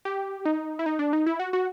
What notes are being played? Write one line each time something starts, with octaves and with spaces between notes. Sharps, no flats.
G4
D#4
E4
D#4
D4
D#4
E4
F#4
F#4